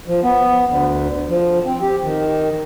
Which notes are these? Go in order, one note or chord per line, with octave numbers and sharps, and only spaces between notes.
F3
B3
D2
F3
C4
G4
D#3